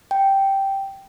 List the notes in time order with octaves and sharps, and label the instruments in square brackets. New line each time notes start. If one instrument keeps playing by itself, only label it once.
[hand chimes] G5